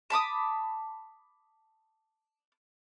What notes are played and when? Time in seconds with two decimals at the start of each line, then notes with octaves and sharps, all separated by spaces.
0.10 A5 B5 D6 D#6